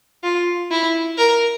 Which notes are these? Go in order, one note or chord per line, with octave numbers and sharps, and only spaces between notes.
F4
E4
A#4